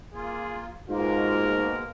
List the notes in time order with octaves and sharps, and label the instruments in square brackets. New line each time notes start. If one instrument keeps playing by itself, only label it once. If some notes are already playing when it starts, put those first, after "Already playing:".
[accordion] A#3 F4 [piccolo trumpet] G#4
[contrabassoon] G#2 [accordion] B2 G#3 A#3 [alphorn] F4 [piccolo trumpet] A#4